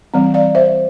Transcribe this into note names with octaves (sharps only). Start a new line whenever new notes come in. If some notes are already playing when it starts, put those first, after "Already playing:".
E3 G3 C4
D5 F5
C5 E5